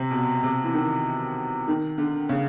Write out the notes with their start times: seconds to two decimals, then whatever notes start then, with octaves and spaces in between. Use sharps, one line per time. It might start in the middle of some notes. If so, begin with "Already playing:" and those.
Already playing: C3
0.11 B2
0.43 C3
0.64 E3
0.74 D#3
1.68 D#3
1.98 D3
2.29 C#3